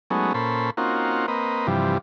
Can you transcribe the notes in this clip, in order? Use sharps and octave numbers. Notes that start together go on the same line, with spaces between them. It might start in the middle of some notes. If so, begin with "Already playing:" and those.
F#3 G#3 A3 B3 C#4 D#4
A#2 C#4 A4 C5 B5
A#3 C4 C#4 D#4 F4 F#4
A#3 C4 B4 D#5
G2 C3 E3 F3 G3